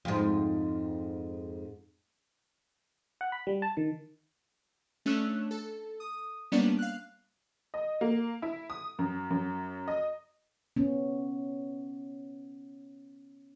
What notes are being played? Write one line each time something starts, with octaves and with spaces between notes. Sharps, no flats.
F2 G#2
F#5
B5
G3
A5
D#3
A3 C#4 D4 E6 F#6
A4
D#6
G3 A#3 B3 C#4 D4 D5
F5 F#6
D#5
A#3
E4
D#6
F#2
F#2
D#5
B3 C#4